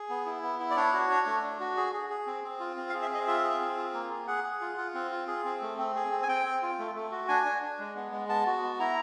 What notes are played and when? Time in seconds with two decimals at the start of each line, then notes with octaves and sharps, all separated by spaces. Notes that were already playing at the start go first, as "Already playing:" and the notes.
Already playing: G#4
0.09 B3
0.26 E4
0.43 B3
0.60 E4
0.70 D5
0.76 D4 C#5
0.93 F#4
1.10 D4
1.26 A3
1.43 D4
1.60 F#4
1.77 G#4
1.93 G#4
2.10 G#4
2.27 C4
2.44 C4
2.60 F4
2.77 C4
2.90 F5
2.94 G#4
3.02 E5
3.10 C4 D#5
3.27 F4 E5
3.44 G#4
3.61 C4
3.77 F4
3.94 A#3
4.10 G#4
4.27 G#4 F#5
4.44 G#4
4.61 F4
4.78 F4
4.94 C4
5.11 F4
5.28 G#4
5.45 C4
5.61 A3
5.78 C4
5.95 G#4
6.11 C4
6.23 G#5
6.28 C4 G5
6.45 C4
6.62 F4
6.78 A3
6.95 A3
7.12 F#4
7.28 D4 G#5
7.45 D4
7.63 D4
7.79 G#3
7.96 B3
8.12 G#3
8.29 B3 A5
8.46 F#4
8.63 B3
8.80 E4 A#5